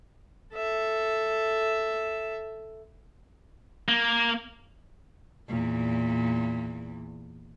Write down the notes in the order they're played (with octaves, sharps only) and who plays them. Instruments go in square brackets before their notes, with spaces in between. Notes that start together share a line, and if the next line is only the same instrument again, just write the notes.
[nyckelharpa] A4 E5
[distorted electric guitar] A#3
[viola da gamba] E2 A#2